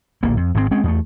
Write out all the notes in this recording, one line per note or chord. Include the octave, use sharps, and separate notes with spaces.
D1 A#1 A#2 A#3
F2
G#1 G#2 B2 C4
G#3 C4 C#4
E2 A3